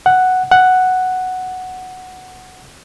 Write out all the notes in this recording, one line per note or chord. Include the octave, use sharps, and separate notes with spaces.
F#5
F#5